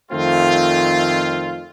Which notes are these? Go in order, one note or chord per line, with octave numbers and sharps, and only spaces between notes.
F2 D#3 A3 C4 F4